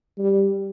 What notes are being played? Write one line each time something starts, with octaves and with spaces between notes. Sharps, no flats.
G3